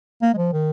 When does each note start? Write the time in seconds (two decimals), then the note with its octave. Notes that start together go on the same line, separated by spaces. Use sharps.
0.22 A#3
0.34 G#3
0.37 F3
0.53 D#3